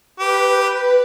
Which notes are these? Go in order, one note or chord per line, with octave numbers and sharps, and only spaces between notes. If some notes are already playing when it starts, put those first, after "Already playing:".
G4 B4